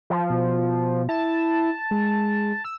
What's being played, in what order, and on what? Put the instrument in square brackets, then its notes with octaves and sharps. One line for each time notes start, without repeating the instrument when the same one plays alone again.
[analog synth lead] F3
[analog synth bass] B2
[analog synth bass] E4 [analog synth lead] A5
[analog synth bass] G#3
[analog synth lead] E6